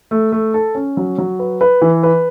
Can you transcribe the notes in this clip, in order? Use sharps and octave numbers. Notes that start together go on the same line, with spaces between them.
A3
A3
A4
C#4
F#3
F#3
B4
B4
E3
B4